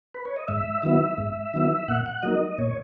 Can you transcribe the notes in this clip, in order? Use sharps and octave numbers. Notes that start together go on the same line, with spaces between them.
B4
C#5
D#5
G#2 E5
D#3 F#3 B3 E4 E5
G#2
D#3 F#3 B3 E4
A#2 F#5
F#5
F#3 A#3 D#4 D#5
A#2 C#5